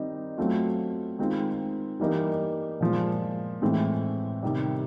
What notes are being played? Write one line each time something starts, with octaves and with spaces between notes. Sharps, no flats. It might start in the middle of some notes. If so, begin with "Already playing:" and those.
Already playing: D#3 G3 C4 D#4
F#3 A3 C4 F4
D#3 G#3 C4 F4
E3 G3 A#3 D#4
A#2 F3 G#3
A2 E3 G#3 C4
C3 D#3 G3